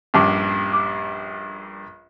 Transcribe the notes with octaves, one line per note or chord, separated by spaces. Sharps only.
A#1 G2 C#4 A5 D6
D6